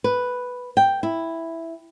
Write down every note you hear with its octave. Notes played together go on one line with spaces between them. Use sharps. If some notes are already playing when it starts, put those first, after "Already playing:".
B4
G5
E4